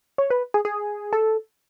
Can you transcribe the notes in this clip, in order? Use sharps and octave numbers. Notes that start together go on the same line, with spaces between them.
C#5
B4
G#4
G#4
A4